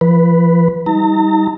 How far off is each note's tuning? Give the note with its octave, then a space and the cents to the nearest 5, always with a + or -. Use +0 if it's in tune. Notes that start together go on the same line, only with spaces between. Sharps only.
F3 -35 B4 +0
G3 +0 D#4 +35 A#5 -40